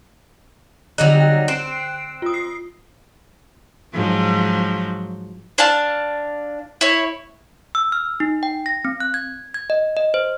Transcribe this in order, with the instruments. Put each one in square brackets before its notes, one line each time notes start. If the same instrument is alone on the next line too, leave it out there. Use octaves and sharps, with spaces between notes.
[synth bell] D3 F#6 [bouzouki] F#3 G3 D#4
[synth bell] G5
[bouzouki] C4 [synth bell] F#6 C7 D7
[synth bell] F4 D#6
C7
[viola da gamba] G#2 F3 F#3
[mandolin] D4 F5 A5
E4 C#5
[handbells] E6
F6
D#4
G5
A#6
C4
F#6
G#6
G#6
D#5
D#5
C5